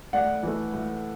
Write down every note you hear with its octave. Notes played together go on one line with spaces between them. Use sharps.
A2 D5 F#5
E3 A3
A2